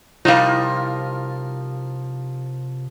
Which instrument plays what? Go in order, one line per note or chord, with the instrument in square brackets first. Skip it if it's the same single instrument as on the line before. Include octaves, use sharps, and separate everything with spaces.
[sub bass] C3 [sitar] F3 A#4 [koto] G3 D#4 [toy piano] E4 F5